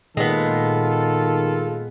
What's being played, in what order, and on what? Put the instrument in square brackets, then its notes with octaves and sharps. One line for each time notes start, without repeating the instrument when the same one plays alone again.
[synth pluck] A#2 [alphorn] D#3 [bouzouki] G#3 B3 [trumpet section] F4 A4